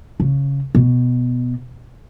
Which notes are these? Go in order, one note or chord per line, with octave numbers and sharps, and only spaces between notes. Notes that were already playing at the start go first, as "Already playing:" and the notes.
C#3
B2